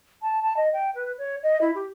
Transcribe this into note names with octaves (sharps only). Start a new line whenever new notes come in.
A5
A5
D#5
G5
B4
C#5
D#5
E4
G4